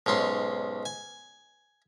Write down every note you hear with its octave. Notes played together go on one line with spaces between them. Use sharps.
B1 G#2 C#4 C6
G#5